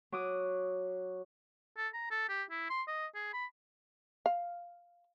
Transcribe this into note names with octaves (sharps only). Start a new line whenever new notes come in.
F#3 D6 D#6
A4
A#5
A4
G4
E4
C6
D#5
G#4
B5
F5